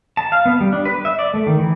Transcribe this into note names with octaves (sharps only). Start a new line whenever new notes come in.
A5
F5
B3
G3
D4
B4
E5
D5
A3
D#3
E3